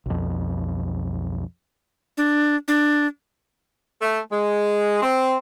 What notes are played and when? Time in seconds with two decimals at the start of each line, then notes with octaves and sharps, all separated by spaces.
0.06 B1 F2
2.17 D4
2.68 D4
4.02 A3
4.31 G#3
5.03 C4